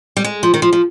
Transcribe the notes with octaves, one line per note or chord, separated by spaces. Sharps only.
G3
G#3
F3
D#3
F3
F3